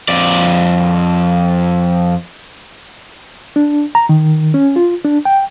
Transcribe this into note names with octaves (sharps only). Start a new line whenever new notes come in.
F2 D5
D4
A#5
D#3
C#4
F4
D4
G5